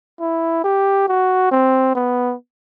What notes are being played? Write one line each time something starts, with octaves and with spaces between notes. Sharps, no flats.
E4
G4
F#4
C4
B3